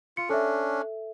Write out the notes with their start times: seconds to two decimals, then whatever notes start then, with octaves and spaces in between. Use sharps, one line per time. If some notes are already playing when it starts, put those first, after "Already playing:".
0.17 F4 C#7
0.29 C#4 D4 A4 E5